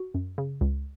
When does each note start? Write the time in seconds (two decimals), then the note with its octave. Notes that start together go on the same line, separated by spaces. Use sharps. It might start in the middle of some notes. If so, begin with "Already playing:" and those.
Already playing: F#4
0.14 F#2
0.38 C#3
0.61 C#2